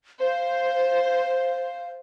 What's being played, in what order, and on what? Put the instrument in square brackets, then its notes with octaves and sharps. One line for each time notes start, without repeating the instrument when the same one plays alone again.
[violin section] C5 [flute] F5